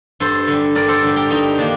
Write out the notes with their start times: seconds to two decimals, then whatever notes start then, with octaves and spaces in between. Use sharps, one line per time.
0.20 G2 A4 C5
0.47 D3 G3
0.75 G2 A#4 D5
0.88 A4 C5
1.03 D3 G3
1.16 G4 A#4
1.30 G2 D#4 G4
1.58 D#3 A#3 D4